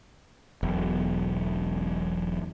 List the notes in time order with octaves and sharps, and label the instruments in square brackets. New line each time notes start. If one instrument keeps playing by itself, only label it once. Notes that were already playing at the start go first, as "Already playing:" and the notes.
[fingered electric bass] E1 B1